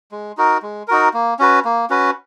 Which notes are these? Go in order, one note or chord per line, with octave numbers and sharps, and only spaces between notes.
G#3
D#4 F#4 A#4
G#3
D#4 F#4 A#4
A#3
C#4 F#4 B4
A#3
C#4 F#4 B4